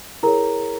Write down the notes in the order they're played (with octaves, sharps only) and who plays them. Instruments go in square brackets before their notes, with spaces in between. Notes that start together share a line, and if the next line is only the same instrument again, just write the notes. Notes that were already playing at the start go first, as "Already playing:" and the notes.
[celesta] E4 G#4 A#4 C#5 A#5